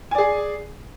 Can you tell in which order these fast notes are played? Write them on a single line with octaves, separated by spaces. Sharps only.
G#5 D5 G#4